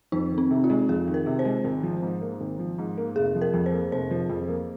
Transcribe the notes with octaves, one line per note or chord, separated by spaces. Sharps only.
F2 D#4
D#3
C4
C3
F4
G#3
F2 G#4
D#3
A#4
C3
C5
G#3
G#1
F3
G#2
A#3
G#1
F3
G#2
A#3
F1 G#4
F3
A#4
F2
C5
A#3
F1 C5
F3
F2
A#3